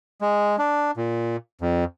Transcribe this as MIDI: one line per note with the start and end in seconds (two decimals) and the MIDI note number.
0.21 0.56 56
0.59 0.91 62
0.97 1.36 46
1.61 1.84 41